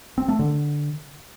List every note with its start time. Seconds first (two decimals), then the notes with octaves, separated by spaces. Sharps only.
0.18 C4
0.28 A3
0.39 D3